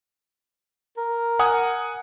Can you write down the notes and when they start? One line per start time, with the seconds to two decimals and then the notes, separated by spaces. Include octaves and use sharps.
0.97 A#4
1.39 F#5 G#5 D#6